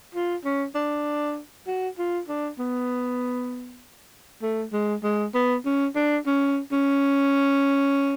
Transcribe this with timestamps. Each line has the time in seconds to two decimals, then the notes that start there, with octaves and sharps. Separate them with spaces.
0.15 F4
0.45 C#4
0.75 D4
1.67 F#4
1.99 F4
2.28 D4
2.59 B3
4.42 A3
4.73 G#3
5.04 G#3
5.35 B3
5.65 C#4
5.96 D4
6.27 C#4
6.72 C#4